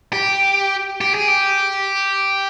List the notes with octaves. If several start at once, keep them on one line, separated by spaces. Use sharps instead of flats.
G4
G4
G#4
G4